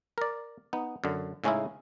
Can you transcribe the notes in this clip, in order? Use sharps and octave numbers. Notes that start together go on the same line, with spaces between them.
A#4 D5
B3 D#4
F#2 D3
A2 C#3 G#3 C#4 D#4 E4